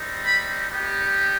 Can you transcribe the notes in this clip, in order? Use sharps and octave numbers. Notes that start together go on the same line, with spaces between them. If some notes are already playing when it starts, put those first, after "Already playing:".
Already playing: G3 C4 D#4
B5
G3 B3 D#4 G4